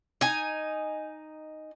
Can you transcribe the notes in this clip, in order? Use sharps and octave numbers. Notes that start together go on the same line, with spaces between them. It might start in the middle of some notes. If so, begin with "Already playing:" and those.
D#4 G#5